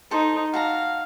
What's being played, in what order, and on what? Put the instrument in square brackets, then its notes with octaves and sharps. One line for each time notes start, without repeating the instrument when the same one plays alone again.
[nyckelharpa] D#4 [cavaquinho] A4 C5
[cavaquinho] F#4 A5 A#5 [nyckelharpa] F5